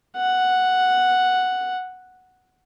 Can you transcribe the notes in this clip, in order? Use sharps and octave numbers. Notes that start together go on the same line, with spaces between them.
F#5